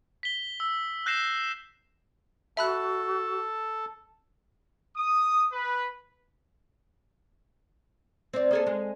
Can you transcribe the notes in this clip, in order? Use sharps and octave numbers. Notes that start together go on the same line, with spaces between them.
B6 G7
E6
F#6 G6 A#6 C7 E7
F#4 A4 E5 A5 B5 F#6
D#6
B4
C4 D5
A#3 G#4 A4
G#3